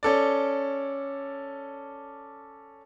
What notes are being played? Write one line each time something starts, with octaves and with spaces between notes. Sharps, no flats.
C#4 A4 D5